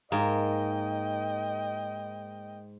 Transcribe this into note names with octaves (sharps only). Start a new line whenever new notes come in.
G#2 A#3 D#5 G5